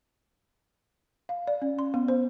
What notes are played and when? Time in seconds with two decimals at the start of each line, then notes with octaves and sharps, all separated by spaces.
1.29 F5
1.47 D5
1.62 C#4
1.79 C6
1.94 B3
2.08 C5